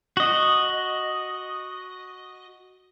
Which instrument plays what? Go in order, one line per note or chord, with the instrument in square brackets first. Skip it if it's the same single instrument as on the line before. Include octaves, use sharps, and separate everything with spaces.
[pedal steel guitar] F#4 D#5